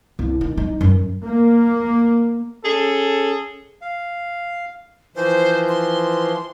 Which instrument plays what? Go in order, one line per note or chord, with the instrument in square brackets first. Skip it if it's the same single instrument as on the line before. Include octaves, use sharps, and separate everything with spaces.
[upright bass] C2
D#3
D#4
F#2
[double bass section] A#3
[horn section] C#4 G#4 A4
[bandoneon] F5
[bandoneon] E3 F3 [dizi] C5
[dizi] C6